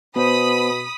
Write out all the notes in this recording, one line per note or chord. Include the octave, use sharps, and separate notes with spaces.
B2 B3 C5 B5 D#6